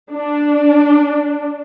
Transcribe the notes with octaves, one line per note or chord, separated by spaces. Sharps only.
D4